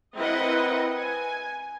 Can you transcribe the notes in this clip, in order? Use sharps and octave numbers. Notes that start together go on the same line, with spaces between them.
C4 E4 A#4 B4 D#5 F#5
G#5